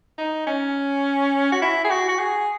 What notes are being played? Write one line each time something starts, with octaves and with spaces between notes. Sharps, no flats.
D#4
C#4
F#4
E4
G#4
F#4
F#4
G#4